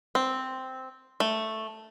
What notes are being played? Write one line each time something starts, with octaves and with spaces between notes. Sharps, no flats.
C4
A3